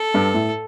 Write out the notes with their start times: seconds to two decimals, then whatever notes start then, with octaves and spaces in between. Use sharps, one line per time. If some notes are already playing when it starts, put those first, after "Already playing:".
Already playing: A4
0.14 G2
0.34 A2